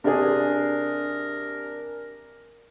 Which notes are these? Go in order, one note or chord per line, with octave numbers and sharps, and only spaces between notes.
C3 D4 G#4 A#4